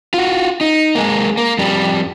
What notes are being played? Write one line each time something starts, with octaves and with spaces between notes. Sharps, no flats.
F4 F#4
D#4
G#3 A#3
A#3
F2 G3